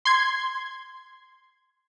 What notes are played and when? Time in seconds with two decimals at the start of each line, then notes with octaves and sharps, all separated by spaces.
0.05 C6 G#6